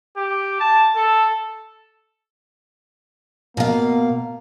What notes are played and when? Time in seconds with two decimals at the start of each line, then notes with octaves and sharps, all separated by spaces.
0.17 G4
0.60 A5
0.96 A4
3.57 B2 A#3 F5